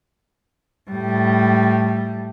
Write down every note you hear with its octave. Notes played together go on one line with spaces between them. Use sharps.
A2 G3